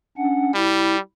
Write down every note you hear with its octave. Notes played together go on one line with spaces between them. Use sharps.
C#4 D4 F#5
G3 E4